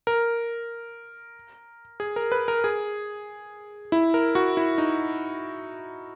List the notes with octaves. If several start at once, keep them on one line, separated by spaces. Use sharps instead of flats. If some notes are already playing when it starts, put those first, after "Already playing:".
A#4
G#4
A#4
B4
A#4
G#4
E4
A#4
F#4
E4
D#4